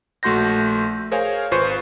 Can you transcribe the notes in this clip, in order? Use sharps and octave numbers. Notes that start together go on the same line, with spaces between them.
A#1 A3 F#4 C6 G6 A#6
G#4 A#4 C5 C#5 F5 G#5
G#1 F4 B4 C5 C#6